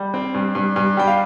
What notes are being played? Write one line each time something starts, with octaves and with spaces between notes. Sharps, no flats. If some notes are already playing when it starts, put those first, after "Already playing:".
Already playing: G3
C4
G2
G2
G2
G3 G5
F5